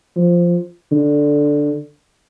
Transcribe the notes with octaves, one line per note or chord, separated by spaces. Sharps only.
F3
D3